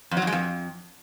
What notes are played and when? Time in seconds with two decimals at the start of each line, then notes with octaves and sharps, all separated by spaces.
0.11 F2
0.17 F#3
0.22 F2
0.27 G#3
0.32 F2